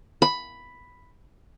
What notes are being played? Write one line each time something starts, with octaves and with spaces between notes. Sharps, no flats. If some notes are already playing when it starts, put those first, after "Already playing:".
B5